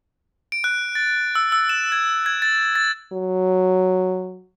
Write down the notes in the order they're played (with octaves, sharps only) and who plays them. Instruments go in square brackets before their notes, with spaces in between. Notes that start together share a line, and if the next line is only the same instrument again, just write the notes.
[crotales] D7
F#6
A6
E6
E6
E7
G#6
G#6
A6
A6
[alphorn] F#3